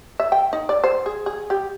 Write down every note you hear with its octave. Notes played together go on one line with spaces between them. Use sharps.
E5
G5
D#4
D5
C5
G#4
G#4
G4